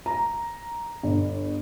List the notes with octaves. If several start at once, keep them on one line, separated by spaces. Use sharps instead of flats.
A#5
G1